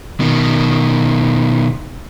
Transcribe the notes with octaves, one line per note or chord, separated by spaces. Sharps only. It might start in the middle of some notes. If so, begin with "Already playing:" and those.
B2 D#3